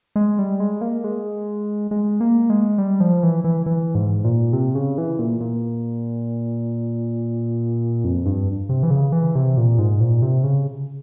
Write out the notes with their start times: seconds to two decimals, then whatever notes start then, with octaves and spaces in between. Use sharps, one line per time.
0.16 G#3
0.39 G3
0.60 G#3
0.81 A#3
1.04 G#3
1.91 G#3
2.21 A#3
2.50 G#3
2.78 G3
3.00 F3
3.23 E3
3.44 E3
3.66 E3
3.95 G#2
4.25 A#2
4.53 C3
4.75 C#3
4.98 E3
5.19 A#2
5.41 A#2
8.04 F2
8.26 G2
8.69 C3
8.83 E3
8.91 C#3
9.12 E3
9.35 C3
9.57 A#2
9.78 G#2
10.00 A#2
10.22 C3
10.44 C#3